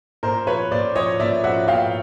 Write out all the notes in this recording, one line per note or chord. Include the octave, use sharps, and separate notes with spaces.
A#2 A#4 C5
F3 B4 C#5
A#2 C5 D5
F3 C#5 D#5
A#2 D5 E5
F3 E5 F#5
A#2 F5 G5